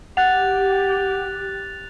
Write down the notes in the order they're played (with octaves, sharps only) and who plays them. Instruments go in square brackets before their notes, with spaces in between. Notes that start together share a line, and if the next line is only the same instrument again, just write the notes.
[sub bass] F1 [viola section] G4 [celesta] F#5 [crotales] F#6 A6 F7